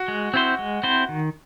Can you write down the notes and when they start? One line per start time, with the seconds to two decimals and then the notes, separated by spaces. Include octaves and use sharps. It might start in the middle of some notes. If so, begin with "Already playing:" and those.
Already playing: F#4
0.08 G#3
0.34 C4 E4 C5
0.59 G#3
0.83 C4 E4 C5
1.09 D#3